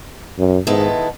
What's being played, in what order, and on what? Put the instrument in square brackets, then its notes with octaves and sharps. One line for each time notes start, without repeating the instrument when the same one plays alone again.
[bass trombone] F#2
[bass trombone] G#2 [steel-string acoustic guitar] D#3 G#3 B3 E4 A4